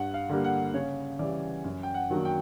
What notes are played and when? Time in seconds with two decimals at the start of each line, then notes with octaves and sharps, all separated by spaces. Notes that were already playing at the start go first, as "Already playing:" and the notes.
Already playing: G2 F#5
0.14 F5
0.29 D3 G3 A#3
0.44 F#5
0.74 C#3 C#5
1.19 E3 G3 D5
1.64 F#2
1.83 G5
1.94 F#5
2.10 D#3 F#3 A#3 D4
2.25 G5